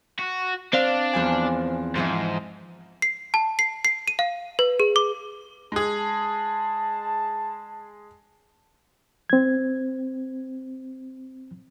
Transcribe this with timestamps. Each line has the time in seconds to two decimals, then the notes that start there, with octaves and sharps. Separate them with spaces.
0.19 F#4
0.73 C4 D4 C5 D5 F5
1.13 E2 F3 G#5
1.95 G#2 E3 F3 C5
3.02 C7
3.34 A5
3.59 C7
3.85 C7
4.08 D#7
4.19 F5
4.59 B4
4.80 G#4
4.96 D6
5.72 G#3 G#4 A5
9.30 C4 G#6